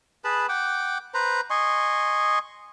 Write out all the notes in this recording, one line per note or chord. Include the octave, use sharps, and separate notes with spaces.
G#4 B4 A5 B5
F#5 G5 D6
B4 C5 A#5
D#5 G#5 C6 C#6